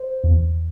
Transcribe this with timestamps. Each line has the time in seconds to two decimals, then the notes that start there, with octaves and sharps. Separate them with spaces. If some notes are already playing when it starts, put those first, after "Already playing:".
Already playing: C5
0.24 E2